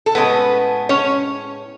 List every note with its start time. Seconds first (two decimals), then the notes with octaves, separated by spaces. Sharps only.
0.06 A4
0.15 A2 G#3 B3 C#4 B4
0.89 C#4 C#5